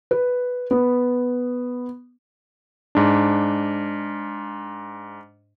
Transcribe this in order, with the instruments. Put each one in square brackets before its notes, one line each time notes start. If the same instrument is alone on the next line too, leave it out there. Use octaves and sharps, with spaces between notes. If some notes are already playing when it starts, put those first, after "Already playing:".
[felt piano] B4
B3
[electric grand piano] G#2 D4